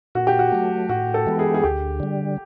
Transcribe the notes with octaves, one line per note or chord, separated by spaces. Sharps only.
A#2 F#4
G4
F#4
F#3 A3
A2 F#4
A4
E3 G#3 B3
G#4
G#4
D2 G4
D3 G3